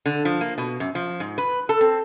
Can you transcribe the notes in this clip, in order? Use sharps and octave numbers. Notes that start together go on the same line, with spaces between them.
D3
F3
A#3
B2
F#2
F3
G#2
B4
A4
C4